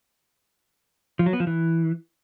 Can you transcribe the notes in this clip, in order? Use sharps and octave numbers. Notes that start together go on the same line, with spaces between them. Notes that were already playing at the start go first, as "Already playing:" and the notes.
F3
F#3
B3
F3
E3